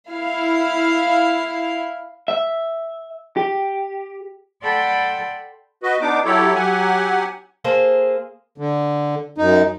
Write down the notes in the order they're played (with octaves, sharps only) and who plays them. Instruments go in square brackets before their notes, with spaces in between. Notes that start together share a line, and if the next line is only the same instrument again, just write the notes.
[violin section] E4 F5
[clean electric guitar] E5
G4
[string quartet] A4 D5 F#5 G5 B5 C6
[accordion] F#4 B4 D#5
B3 D4 D#4 D6
F#3 E4 G4 A4 C#5
F#3 G4 F#5 G#5
[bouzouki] A#3 G#4 A4 C5
[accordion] D3
F#2 D#4